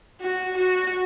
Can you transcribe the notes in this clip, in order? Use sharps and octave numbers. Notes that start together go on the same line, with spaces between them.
F#4
F#4